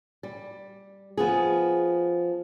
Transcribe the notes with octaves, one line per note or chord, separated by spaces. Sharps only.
G3
F3 B3 G#4